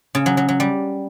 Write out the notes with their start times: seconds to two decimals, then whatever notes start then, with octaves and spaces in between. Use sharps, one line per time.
0.15 C#3
0.26 F#3
0.37 F#3
0.49 F#3
0.60 G3